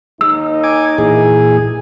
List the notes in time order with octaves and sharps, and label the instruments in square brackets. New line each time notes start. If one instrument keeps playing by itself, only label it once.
[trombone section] D#2 D#3 D#4 [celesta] E6
[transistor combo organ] G#5 D6
[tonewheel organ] A#2 E3 [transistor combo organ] G#4